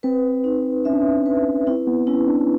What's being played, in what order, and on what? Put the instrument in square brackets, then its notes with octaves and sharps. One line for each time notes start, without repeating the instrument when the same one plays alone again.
[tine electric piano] C4 [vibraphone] B4
[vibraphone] D#4
[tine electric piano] C#4 [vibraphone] E5
[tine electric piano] D4
C#4
[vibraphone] B4
[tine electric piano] C4 [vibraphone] E4
[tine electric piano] B3
[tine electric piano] C#4 [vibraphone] E4
[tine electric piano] D4